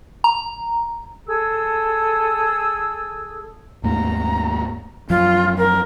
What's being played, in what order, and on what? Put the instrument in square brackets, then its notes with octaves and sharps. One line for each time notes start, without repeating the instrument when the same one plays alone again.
[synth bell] A#5
[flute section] G#4 A4 E6
[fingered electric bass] D#2 G#2 A3 [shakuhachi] A#5
[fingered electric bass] F#2 F3 F#3 [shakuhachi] F4
[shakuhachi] A#4